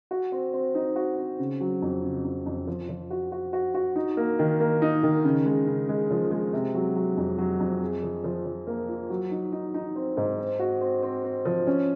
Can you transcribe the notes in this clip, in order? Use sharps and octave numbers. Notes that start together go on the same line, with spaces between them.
F#4
C4
C4
D#4
F#4
C4
C#3
F#3
F2
C#3
F2
F2
F3
F3
F#4
F#4
F#4
F#4
D#4
A#3
D#3
A#3
D#4
D#3
C#3
G#3
C#3
G#3
F3
G#3
C3
F#3
F#3
F2
F#3
F2
G#4
F3
F3
F3
A#3
F4
F#3
D#4
D#4
D#4
C4
G#2
C4
F#4
C4
C4
C4
F3
C#4